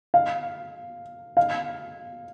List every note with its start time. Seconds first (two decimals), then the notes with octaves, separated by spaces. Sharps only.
0.14 F5
1.37 F5